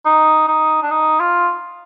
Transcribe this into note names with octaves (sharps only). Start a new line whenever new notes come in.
D#4
D#4
D4
D#4
F4